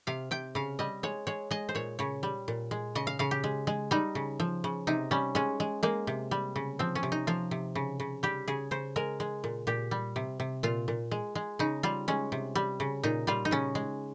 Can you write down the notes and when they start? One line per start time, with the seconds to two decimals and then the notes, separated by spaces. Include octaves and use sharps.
0.07 C3 F5
0.31 C3 G5
0.55 C#3 F5
0.79 G3 D#5
1.03 G#3 C#5
1.27 G#3 C#5
1.51 G#3 D#5
1.69 C5
1.75 A#2 C#5
1.99 C#3 C#5
2.23 G3
2.48 A#2
2.71 G#3
2.95 C#3 D#5
3.07 F5
3.19 C#3 F5
3.31 G4
3.44 G#3
3.67 G#3
3.91 G3 D#4
4.15 C#3
4.40 F3
4.64 C#3
4.87 C3 D#4
5.11 G3 C#4
5.35 G#3 C#4
5.60 G#3
5.83 G#3 A#3
6.07 C3
6.31 G3
6.56 C#3
6.79 F3 C4
6.95 C#4
7.03 C3
7.12 D#4
7.27 F3 F4
7.51 C3
7.75 C#3
8.00 C#3
8.23 G3 G4
8.48 C#3 G#4
8.71 C#3 C5
8.96 G#3 A#4
9.20 G#3
9.44 A#2
9.67 A#2 G4
9.91 G3
10.16 C3
10.40 C3
10.63 A#2 F4
10.88 A#2
11.11 G#3
11.35 G#3
11.59 C#3 D#4
11.83 G3 F4
12.08 G#3 C#4
12.32 C3
12.55 G3
12.80 C#3
13.03 A#2 D#4
13.27 G3 F4
13.45 D#4
13.51 C#3 C#4
13.75 G#3